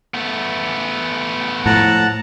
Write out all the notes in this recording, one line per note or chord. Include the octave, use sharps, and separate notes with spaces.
A3 B3
A2 F3 F#5 A5 A#5